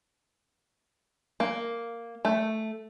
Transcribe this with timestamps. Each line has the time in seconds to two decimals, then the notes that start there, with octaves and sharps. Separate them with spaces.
1.40 A#3
2.25 A3